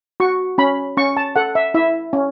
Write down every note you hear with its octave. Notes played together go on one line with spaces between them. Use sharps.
F#4 C#6
C#4 B5
C#4 C#6
A5
A4 F#5
E5
E4 E5
C#4